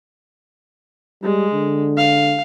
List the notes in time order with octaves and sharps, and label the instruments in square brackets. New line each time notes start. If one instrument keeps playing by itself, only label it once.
[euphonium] G3 [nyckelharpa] G#3
[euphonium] D3
[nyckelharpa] F5